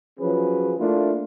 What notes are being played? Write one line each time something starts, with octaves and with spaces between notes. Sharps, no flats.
F3 F#3 C#4 G#4 B4
A3 A#3 D4 E4 F4